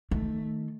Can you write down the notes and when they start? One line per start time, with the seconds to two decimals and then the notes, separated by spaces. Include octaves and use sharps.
0.11 D#3 A3